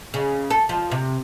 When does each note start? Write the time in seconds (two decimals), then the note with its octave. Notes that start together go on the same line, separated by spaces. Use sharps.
0.14 C#3
0.50 A4
0.69 F3
0.92 C3